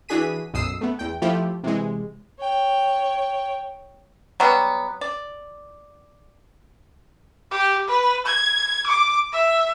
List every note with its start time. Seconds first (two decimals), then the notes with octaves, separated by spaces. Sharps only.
0.09 E3 D4 F#4 G#4 B6 D#7
0.53 B1 F#2 D#6 E6 C7
0.81 A3 B3
0.99 E2 G5
1.22 F3 A3 E4 F4 G4
1.63 C3 E3 G#3
2.39 C#5 G5
4.40 F#3 G3 B3
5.01 D5
7.51 G4
7.88 B4
8.26 G#6
8.87 D6
9.33 E5